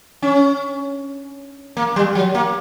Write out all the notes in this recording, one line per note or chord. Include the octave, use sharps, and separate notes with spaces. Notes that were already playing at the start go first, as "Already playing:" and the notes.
C#4
A#3
G3
F#3
A#3